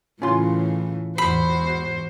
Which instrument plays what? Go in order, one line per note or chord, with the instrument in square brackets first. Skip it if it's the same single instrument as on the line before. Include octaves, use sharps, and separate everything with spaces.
[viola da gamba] A2 C#3 E3 [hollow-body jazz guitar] C#4 F4 C6
[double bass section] E2 G#2 [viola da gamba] F#4 C5 [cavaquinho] B5